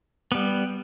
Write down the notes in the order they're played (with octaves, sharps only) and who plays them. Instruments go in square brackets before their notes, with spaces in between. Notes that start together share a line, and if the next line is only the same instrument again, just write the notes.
[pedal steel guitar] G3 B3